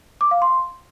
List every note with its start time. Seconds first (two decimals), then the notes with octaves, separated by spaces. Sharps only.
0.21 D6
0.31 F5
0.42 C6